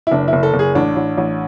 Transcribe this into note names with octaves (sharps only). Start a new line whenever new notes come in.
E4
F#1 D4
E4
F#1
A4
F#1
G#4
A1 D4
A1
A1